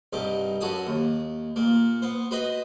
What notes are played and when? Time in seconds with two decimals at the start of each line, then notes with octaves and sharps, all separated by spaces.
0.13 C2 G2 D#4 D6
0.61 F#2 F#4 A4 G#5 D#6
0.87 D#2
1.56 A#2 A#3
2.02 B3 C5
2.31 F#4 B4 C5 D#5 B5